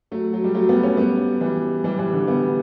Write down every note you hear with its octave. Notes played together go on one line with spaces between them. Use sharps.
F#3 A3
F#3
G3
F#3 A3
G3 B3
A3 C#4
G3 B3
E3 G3
E3 G3
E3 G3
D3
G3 B3